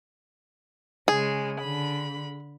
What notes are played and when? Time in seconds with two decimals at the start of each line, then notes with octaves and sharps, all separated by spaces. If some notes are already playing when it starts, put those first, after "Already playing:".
1.08 C#3 G#3 G#4
1.60 D3 B5